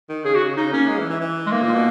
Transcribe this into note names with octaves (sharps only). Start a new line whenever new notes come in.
D#3
C#3 G#4
F#4
C#3
C#3 D#4
A#3 C#4
G#3
E3
E3
E3
G#3
D#3 A#3
A#2
B2